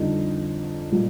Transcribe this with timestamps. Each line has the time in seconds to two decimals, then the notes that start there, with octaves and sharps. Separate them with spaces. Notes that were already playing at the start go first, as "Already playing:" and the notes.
Already playing: F2 D3 G3 D#4
0.91 A#2 G3